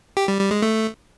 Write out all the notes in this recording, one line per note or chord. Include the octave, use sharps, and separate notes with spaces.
G4
G3
G3
G#3
A3